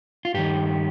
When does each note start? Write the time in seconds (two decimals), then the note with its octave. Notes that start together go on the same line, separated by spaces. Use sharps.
0.25 F4
0.34 G2 D#3 G4